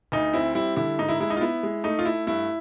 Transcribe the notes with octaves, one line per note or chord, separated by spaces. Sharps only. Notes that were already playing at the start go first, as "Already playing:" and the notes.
D2 D#4
C4 E4
G3 E4
D3 E4
G#2 D#4
E4
G#3 E4
D#4
F4
B3 E4
G#3
A3 D#4
F4
A3 E4
G2 E4